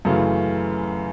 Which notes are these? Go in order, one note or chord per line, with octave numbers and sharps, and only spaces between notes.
F#2 C#3 E3 A3